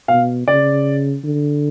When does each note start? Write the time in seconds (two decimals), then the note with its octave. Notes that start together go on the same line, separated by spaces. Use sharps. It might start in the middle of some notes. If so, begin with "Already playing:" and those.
0.08 B2 F5
0.47 C#3 D5
1.24 D3